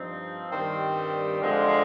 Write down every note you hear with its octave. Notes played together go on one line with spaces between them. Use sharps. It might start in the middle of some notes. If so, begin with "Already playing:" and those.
Already playing: G2 F3 C4 D#4
G2 D#3 G3 C4
D3 F3 G#3 C4